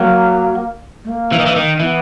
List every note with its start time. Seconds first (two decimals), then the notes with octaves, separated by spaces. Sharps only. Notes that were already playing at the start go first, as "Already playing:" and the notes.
Already playing: F#3 A#3
1.04 A3
1.08 A#3
1.32 E3
1.39 D#3
1.46 E3
1.56 D#3
1.80 E3 B3